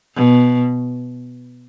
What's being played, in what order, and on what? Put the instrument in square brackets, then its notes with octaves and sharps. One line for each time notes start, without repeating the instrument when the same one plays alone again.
[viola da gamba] B2